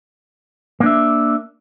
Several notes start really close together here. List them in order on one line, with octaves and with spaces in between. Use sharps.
A#3 D4 E5